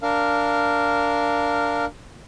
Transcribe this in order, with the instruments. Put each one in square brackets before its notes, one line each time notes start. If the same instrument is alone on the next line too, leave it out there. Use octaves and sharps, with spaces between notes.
[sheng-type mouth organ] D4 A#4 F5